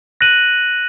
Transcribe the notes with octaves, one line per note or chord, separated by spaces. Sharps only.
F#6 A#6 D#7 F#7